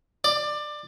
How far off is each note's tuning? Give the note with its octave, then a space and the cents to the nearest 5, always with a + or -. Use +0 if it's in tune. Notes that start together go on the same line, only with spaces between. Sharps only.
D5 +20